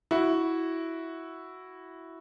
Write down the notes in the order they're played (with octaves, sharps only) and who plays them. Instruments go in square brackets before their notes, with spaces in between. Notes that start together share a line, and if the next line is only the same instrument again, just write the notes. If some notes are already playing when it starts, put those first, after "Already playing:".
[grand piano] E4 F#4